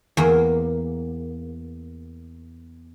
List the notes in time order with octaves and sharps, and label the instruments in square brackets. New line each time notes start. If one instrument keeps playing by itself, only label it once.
[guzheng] E2 A#3